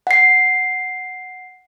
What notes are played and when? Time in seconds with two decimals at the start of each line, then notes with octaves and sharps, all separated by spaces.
0.07 F#5 C7